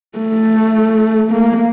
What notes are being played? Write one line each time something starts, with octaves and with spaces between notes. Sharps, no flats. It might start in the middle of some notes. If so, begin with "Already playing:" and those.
A3
A#3